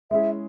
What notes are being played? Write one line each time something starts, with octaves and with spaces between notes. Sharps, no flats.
G#3 C#4 E4 G#4 E5